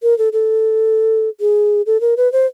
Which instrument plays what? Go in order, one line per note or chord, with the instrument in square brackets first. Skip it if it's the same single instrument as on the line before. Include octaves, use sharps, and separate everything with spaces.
[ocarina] A#4
A4
A4
G#4
A4
A#4
B4
C5